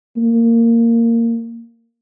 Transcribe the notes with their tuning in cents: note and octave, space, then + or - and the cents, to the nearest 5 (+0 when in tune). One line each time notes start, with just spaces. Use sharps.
A#3 -15